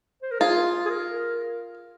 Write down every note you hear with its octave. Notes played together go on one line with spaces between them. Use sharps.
C5
A#4
F4 G#4
G#4
A#4